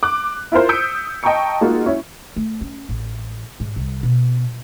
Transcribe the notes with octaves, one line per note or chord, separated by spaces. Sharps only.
D6 F#6
E4 F4 A#4 C5
D#6 E6 G6 B6 C#7 D7
D#5 G5 A5 A#5 C#6 C#7
G#3 A#3 D#4 F4 F#4
C#4 E4 C#5
A3
C#4
A1
G#2
C2
B2